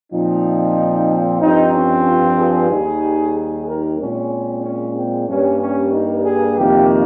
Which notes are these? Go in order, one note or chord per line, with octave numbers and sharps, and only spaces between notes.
A#2 F3 C4 D#4
G2 F3 C4 D#4
C#4
F4
G#4
D#2 D#3 G3
G#4
A#4
A#2 G#3 C4 C#4
C#4
C4
G2 G3 A#3 C#4
C#4
D#4
G#4
F2 C3 D#3 A#3 G4